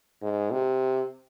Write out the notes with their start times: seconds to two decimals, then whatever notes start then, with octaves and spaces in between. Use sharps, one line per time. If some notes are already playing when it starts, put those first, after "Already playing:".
0.22 G#2
0.51 C3